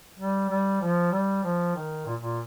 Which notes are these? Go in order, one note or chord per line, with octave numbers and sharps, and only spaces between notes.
G3
G3
F3
G3
F3
D#3
A#2
A#2